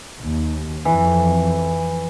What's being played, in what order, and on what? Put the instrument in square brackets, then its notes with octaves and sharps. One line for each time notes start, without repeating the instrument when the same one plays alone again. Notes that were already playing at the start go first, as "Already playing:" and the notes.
[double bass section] D#2
[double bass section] F2 [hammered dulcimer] E3